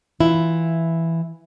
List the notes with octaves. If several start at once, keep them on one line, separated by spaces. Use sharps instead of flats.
E3 E4 F4